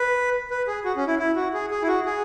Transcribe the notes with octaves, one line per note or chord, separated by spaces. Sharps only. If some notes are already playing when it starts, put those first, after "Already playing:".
Already playing: B4
B4
G#4
F#4
C#4
E4
E4
F#4
G#4
G#4
E4
F#4
G#4